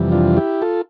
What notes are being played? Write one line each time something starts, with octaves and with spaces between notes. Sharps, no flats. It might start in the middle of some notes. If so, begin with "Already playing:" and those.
Already playing: F2 C3 E3 G3
D4 F4
E4 G4
F4 A4